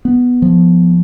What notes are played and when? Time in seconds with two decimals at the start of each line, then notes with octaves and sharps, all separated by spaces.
0.05 B3
0.42 F3